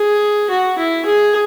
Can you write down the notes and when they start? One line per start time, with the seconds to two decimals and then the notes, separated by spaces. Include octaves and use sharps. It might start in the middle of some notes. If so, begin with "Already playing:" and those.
Already playing: G#4
0.50 F#4
0.78 E4
1.06 G#4